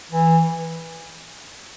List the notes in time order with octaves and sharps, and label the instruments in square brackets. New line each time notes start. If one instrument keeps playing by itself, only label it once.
[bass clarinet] E3